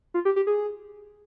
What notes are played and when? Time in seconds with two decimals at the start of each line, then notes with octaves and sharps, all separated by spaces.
0.14 F4
0.25 G4
0.36 G4
0.47 G#4